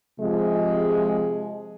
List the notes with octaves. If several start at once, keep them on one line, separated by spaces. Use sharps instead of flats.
C3 F3 G#3